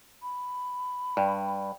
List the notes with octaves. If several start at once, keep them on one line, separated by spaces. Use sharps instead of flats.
B5
G2 D5 G5